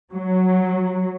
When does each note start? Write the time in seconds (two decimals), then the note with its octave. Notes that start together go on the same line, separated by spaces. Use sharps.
0.13 F#3